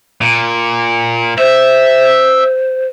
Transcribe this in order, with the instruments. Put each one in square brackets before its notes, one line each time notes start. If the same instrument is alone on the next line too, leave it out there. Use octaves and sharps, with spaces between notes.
[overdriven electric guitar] A#2
[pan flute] C5 [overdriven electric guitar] E5